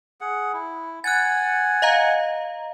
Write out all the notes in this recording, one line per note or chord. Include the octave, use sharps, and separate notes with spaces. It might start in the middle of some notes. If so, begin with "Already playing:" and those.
G#4 F#5
E4
F#5 G#5 F#6 A6
D#5 F5 A#5